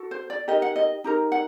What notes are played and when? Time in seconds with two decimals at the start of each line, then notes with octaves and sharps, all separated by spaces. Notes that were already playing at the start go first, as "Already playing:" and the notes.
Already playing: F#4 A4
0.11 C5
0.30 D5
0.48 D#4 G4 A#4 D#5
0.62 F#5
0.76 D#5
1.04 D#4 G4 A#4
1.32 F#5